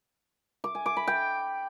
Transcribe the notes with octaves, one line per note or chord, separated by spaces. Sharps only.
D6
G#5
D6
B5
G5